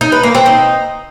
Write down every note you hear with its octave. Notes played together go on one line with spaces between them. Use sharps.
D#4
B4
A#3
C4
D#4